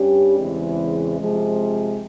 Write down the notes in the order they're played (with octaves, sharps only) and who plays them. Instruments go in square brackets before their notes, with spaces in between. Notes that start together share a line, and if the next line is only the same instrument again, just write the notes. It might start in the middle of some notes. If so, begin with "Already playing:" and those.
Already playing: [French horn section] G2 G3 C#4 G4
E2 C#3 E3 G#3 C4
C3 F3 G#3